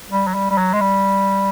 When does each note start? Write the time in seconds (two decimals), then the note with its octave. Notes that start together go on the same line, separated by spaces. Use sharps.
0.10 G3
0.27 F#3
0.34 G3
0.51 G3
0.58 F#3
0.73 G#3
0.81 G3